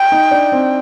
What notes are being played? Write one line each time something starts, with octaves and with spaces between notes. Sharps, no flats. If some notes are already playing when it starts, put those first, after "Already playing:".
Already playing: G5
D#4
D4
C4